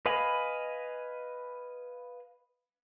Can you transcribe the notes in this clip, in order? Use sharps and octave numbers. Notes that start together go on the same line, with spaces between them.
B4 D#5 F5 G#5 B5